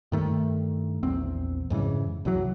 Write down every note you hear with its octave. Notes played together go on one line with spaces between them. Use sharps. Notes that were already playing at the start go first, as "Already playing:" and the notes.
G2 D#3 A3
A#1 E2 C4
F2 G#2 C#3 E3
C2 F#2 E3 F#3